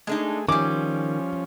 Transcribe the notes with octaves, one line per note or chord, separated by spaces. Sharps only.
G#3 A3 D4 D#4 G#4
D#3 F3 G3 C#4 G#4 D6